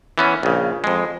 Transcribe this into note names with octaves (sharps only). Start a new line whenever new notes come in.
E3 B3 C#4
A#1 C#3
F2 G#3